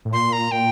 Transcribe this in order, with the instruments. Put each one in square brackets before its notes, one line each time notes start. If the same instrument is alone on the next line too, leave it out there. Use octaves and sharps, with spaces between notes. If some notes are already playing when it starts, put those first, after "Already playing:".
[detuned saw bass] A2
[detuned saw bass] A#2 [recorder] C6
[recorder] A#5
[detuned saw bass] A#2 [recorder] G5